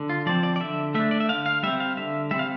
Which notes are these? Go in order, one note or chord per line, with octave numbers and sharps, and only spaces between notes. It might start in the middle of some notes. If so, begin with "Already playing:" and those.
Already playing: D3
F4
F3 C4 D5
D5
D5
D3 E5
A3 D4 E5
D5
E5
D3 F5
F5
G3 C4 E5
F5
D3 E5
G3 C4 E5
F5